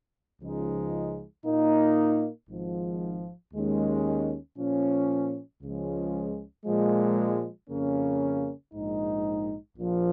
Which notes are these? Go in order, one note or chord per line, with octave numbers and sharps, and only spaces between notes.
C#2 C#3 F3 G#3 D#4
A#2 A#3 D#4
G#1 G#2 F3
D#2 D#3 G#3 C#4
A#2 F3 C#4
C#2 C#3 F3 G#3 C#4
A#2 F3 G#3
F2 C#3 A#3 C#4
A#1 G#2 G#3 D#4
A#1 A#2 F3